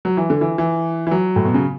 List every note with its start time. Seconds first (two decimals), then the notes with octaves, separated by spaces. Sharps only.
0.05 F#3
0.17 E3
0.30 D3
0.41 E3
0.58 E3
1.07 E3
1.11 F#3
1.36 A2
1.45 B2
1.54 C#3